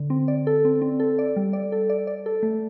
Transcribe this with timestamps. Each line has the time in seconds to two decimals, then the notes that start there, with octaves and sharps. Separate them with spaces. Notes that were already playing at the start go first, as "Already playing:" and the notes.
Already playing: D3
0.10 C4
0.28 D5
0.47 A4
0.65 C4
0.82 C4
1.00 A4
1.19 D5
1.36 G3
1.53 D5
1.72 A4
1.89 D5
2.07 D5
2.26 A4
2.43 A3